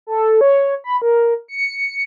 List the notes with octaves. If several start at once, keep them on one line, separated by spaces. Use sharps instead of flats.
A4
C#5
B5
A#4
C#7